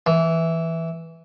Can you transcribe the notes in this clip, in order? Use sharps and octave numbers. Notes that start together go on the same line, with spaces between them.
E3